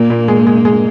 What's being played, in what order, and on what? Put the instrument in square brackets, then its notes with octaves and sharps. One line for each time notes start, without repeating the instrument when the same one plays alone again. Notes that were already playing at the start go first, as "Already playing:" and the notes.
Already playing: [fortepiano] A#2 [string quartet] A#3
[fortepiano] A#2
G#3
G#3
G#3